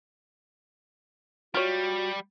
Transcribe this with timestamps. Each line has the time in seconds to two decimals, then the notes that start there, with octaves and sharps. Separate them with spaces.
1.54 G3 F4 F#4 C#5